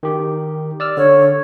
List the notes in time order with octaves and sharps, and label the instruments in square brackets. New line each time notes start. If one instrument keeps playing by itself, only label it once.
[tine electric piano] D#3 G4
D5 E6 F6
[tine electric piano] D3 [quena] C#5